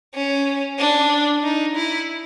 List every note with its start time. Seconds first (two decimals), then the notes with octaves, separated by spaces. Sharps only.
0.14 C#4
0.79 D4
1.43 D#4
1.75 E4